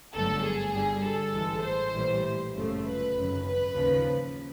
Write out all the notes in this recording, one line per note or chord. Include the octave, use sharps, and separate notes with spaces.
G1 G2 D3 F#3 A3 A4
G#4
G1 G2 D3 G3 G#4
A4
A1 A2 E3 G#3
C5
A#1 A2 E3 G3
G1 F#2 C#3 F3 A3
B4
G#1 F#2 C#3
B4
D#2 C#3 F3